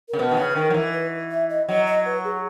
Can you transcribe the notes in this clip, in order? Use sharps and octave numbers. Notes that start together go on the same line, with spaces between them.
C#3 A#4
B2 B4
D#3
C#3
B4
D#3 A#4
F#3
E3
B4
E5
D#5
F#3 D#5
D#5
B4
G#4